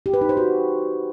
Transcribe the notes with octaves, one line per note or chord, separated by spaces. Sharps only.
G4
B4
D#4
C5
F#4